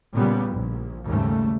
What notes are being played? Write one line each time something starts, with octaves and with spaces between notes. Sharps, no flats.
A#2 C#3 G3 B3
A#1
G#1 D#2 G#2 C#3 G3 A3